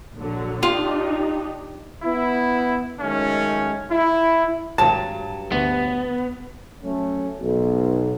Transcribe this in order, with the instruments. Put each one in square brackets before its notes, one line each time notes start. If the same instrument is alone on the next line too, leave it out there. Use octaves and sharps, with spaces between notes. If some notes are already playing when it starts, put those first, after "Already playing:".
[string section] A#1 D3 F#3
[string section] D4 D#4 G4 [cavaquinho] F4
[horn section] B3 E4
F#2 D#3 G#3 A3 C#4
E4
[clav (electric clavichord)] G#1 [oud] G2 F#3 [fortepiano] A5
[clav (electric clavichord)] D2 [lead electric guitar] B3
[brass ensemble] F#3 A3 C#4
B1